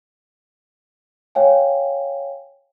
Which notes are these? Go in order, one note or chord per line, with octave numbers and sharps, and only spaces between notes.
C#5 F5 G5 G#5